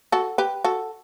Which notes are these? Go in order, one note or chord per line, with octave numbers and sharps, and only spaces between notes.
F#4 A4
G4 B4
F#4 A4